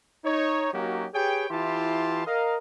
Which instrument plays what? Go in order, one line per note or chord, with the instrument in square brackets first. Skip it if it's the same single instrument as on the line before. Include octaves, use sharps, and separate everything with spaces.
[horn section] D#4 C#5
F#3 A#3 C#4 D#4 F#4 G4
G4 G#4 B4 C#5 G5
E3 E4 F4 G4 A5 C6
A#4 D#5 F5